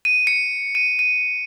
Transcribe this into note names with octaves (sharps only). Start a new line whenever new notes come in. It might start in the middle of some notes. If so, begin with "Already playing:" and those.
D#7
C#7
D#7
D#7